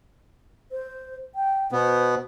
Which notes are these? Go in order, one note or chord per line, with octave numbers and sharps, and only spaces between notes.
C5
G5
B2 B3 C5